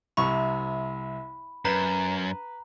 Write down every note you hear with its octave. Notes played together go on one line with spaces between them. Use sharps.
C2 C3 B5 C#6
F#2 B4 A#5